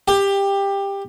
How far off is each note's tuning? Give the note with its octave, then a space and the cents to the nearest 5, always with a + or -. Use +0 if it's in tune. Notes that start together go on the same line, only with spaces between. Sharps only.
G4 +15